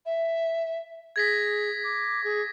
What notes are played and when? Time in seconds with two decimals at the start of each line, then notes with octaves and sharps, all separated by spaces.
0.05 E5
1.16 G#4 G#6 A#6 B6
1.83 D6
2.24 G#4